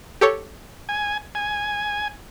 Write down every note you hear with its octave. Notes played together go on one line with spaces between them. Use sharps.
G4 A4 C#5
G#5
G#5